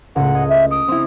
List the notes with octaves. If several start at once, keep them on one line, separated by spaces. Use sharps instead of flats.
C#2 A2 F#5
D#5 G#6
E5
D#6 D7
C4 E4